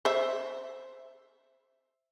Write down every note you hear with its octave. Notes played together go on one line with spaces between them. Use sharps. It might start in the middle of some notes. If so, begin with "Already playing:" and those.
C5 E5